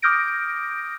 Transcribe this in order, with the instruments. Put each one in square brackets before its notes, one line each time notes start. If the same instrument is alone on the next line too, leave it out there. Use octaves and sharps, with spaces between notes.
[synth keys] D6 D#6 F6 G6 A#6 D7